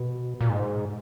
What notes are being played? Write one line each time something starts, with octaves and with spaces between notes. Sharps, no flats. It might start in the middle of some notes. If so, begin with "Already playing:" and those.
Already playing: B2
A#2
G#2